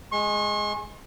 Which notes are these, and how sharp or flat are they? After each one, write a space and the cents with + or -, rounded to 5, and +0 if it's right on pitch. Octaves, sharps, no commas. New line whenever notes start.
G#3 +0 C#6 -45